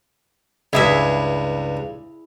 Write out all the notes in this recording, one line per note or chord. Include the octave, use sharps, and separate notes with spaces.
C#2 G2 E4 G#4 E5